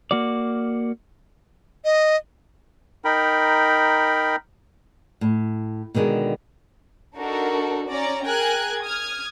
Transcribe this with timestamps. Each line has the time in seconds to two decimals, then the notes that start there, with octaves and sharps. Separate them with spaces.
0.11 A#3 F#4 D5
1.85 D#5
3.05 D#4 A#4 G5 B5
5.21 A2
5.95 B2 D3 D#3 G#3
7.17 D4 D#4 F#4 A4 A#4
7.89 C#4 D5 A#5
8.25 G#4 A#4 G5 G#5 F#6 G#6
8.83 D#6 F6 G#6